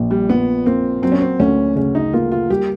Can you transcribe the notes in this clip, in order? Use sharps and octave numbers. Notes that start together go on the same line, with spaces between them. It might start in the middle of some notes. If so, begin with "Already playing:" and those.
Already playing: A#1 F3
G3
A#2 B3
A#3 C4
F#3 C4
C#4
C4
D2 C#4
C#3 C#4
D#4
A#3 F4
F4
G3 G4